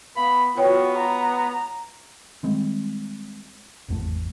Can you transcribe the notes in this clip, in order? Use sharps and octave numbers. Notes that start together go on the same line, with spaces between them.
B3 F5 B5
B3 F4 F#4 B4 C#5 G5
A#5
D#3 G3 G#3 C4
G#1 E2 A3